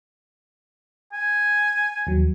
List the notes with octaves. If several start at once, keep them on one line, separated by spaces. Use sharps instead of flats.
G#5
D#2 F#3